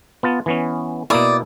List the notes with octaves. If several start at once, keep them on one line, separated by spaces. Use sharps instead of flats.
B3 F4 A5
E3 B3 C#4
B2 A#3 E4 D5 D#6